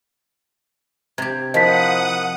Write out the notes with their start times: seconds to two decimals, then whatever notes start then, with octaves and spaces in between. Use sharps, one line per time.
1.18 C3 G4 G#6
1.54 F3 E4 A#4 C5 D#5 F#5 D#6 B6